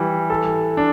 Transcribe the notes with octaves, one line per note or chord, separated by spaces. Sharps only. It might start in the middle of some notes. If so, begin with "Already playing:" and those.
Already playing: E3 G3
A4
D4